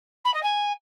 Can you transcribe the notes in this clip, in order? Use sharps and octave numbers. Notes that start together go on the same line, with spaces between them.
B5
D#5
G#5